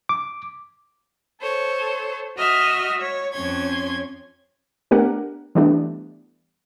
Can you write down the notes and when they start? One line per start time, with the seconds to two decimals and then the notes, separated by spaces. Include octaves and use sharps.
0.09 D6
1.41 A4 C5 C#5
2.38 F#4 D#5 E5 F6
3.01 C#5
3.33 F2 C#4 C#5 C6 G#6
4.91 A3 B3 D4 G4 A#4 F#5
5.55 E3 G3 A3 B3 D4